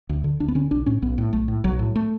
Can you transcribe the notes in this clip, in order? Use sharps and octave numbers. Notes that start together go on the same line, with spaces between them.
D2
D3
D2 D4
B3
D3 C#4
B1 D4
A2 C#4
B1 B3
A2
B1 A3
A2
B1 F#3
A2
A3